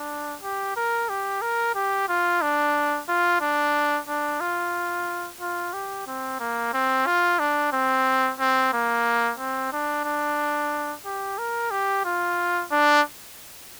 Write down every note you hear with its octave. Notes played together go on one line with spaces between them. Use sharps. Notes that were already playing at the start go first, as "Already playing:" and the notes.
Already playing: D4
G4
A#4
G4
A#4
G4
F4
D4
F4
D4
D4
F4
F4
G4
C4
A#3
C4
F4
D4
C4
C4
A#3
C4
D4
D4
G4
A#4
G4
F4
D4